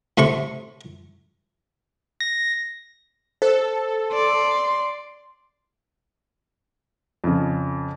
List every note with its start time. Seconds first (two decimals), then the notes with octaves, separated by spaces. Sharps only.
0.18 A2 C3 C6 C#6
2.21 A#6
3.42 A4 C5
4.12 D5 C6
7.24 F2 C#3